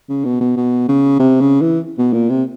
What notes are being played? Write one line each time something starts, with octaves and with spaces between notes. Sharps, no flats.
C#3
B2
B2
B2
C#3
C3
C#3
E3
B2
A#2
C3